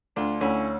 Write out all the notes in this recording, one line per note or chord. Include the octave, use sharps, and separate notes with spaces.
D2 D4 F4
D2 C#4 E4